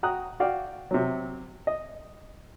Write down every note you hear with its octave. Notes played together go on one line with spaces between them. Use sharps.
F#4 G5 A#5 D#6 F#6
F#4 D5 F5 G5
C3 F#3
D#5